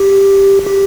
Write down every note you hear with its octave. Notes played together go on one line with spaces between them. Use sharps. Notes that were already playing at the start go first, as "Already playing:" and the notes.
Already playing: G4
G4